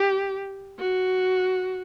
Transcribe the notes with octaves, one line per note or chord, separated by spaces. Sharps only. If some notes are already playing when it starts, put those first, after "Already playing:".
Already playing: G4
F#4